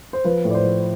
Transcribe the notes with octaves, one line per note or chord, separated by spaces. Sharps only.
C5
F3 B4
A2
D5
C5
F3